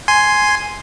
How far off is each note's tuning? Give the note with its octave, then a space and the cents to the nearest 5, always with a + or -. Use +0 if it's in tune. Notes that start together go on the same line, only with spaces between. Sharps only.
G#5 +5 C6 +0